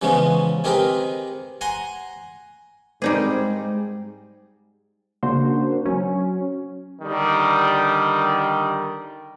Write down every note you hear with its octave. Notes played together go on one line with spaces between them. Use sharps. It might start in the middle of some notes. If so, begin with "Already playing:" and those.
C#3 E3 F3 G#3 B3 C#4
D#3 C4 G4 G#4 A#4 B4
F#5 G#5 A#5 C6
G#2 G3 G#3 C4 D#4 G#4 A#4 D5
C#3 A#3 D4 F#4 C5
F#3 C#4
D3 D#3 G3